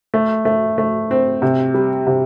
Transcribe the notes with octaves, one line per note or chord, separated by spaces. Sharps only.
A3
A3
A3
C4
C3
G3
C3